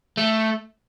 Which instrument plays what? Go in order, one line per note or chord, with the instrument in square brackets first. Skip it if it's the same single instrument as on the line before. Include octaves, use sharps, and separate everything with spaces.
[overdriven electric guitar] A3